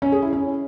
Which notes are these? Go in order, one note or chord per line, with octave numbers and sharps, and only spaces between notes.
C#4
G#4
E4
C#4